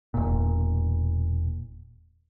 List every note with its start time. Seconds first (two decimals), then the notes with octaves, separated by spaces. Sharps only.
0.14 E1 A#2